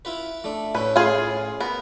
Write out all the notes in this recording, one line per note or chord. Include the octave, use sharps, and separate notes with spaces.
E4 F4 B4
A3 D4
A2 C#4 B4
F4 G#4
B3 A#4